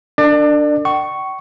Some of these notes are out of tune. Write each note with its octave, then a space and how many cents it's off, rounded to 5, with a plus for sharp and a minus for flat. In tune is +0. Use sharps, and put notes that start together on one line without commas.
D4 +0 A#4 -45 D5 +30
G5 -45 C#6 +0